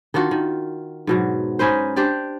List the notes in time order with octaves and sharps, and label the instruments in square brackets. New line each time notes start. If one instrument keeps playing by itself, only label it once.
[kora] D#3 D4 F4 F#4
D#3
G#2 B2 F#3
C#4 D#4 B4 C5
D4 G4 C5 D5